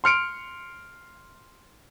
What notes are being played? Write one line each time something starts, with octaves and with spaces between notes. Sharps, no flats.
C6 F6 C#7 D7